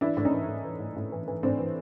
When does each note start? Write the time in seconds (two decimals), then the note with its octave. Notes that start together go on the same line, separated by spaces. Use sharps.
0.01 E3 D4 E4
0.17 A2 D4
0.25 C#4 D#4
0.33 E3
0.48 A2
0.64 E3
0.80 A2
0.96 A2
1.12 E3
1.28 E3
1.43 A2 C4 D4
1.59 E3